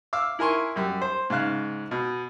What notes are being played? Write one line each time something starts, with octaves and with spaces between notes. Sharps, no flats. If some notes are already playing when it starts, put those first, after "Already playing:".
F5 D6 E6
E4 A#4 G#5 C6 C#6
F#2 G3
C5
G#2 C#3 F5 F#6
B2